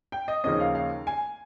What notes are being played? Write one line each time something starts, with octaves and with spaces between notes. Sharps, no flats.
G5
D#5
D#2 C#3 F3 A#3 C#4 D#5
F5
F5
G#5